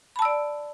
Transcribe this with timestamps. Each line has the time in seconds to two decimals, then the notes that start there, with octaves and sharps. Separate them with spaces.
0.16 B5
0.19 A5
0.22 E6
0.25 D5